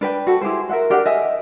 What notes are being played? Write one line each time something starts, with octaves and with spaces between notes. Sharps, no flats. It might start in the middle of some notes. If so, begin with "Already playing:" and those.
D4 B4 G5
F#4 A4
E4 G4 G#4 C5
A#4 E5 F#5
D4 G4 A#4 F#5
D#5 E5 G#5